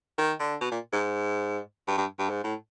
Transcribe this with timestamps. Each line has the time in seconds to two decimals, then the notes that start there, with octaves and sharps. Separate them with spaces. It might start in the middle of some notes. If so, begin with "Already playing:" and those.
0.18 D#3
0.40 D3
0.61 B2
0.71 A#2
0.93 G#2
1.88 G2
1.98 G2
2.19 G2
2.29 G#2
2.44 A2